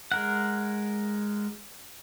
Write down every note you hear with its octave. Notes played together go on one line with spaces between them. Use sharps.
G#3 A#4 F#5